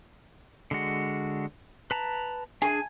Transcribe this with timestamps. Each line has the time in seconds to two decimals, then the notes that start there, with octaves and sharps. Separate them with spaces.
0.71 D3 G#3 F#4
1.91 B4 A5 A#5
2.62 D4 G#4 G#5